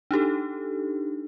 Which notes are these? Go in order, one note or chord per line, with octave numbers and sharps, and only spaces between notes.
D4 D#4 G4 A4